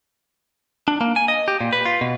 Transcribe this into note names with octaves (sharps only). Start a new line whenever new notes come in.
D4
A#3
G#5
D#5
G4
A#2
B4
F4
B2